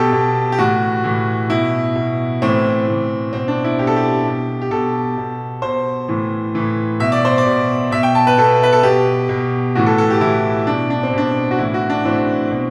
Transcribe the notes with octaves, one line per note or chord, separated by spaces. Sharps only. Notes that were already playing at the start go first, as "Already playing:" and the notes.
Already playing: B2 G4 A4
B2
G4
A2 E3 F#4
A2 E3
B2 E4
B2
A2 E3 C4
A2 E3
B2 C4
D4
E4
B2 G4
A4
G4
B2
G4
B2 A4
B2
B2 C5
A2 E3
A2 E3
B2 E5
D5
C5
D5
B2
B2 E5
G5
A5
B4
B2 A4
B4
A4
B2 G4
B2
A2 E3 F#4
A4
A4
G4
A2 E3 E4
B2 D4
D4
C4
B2 D4
F#4
A2 E3 E4
F#4
D4
A2 E3 C4
B2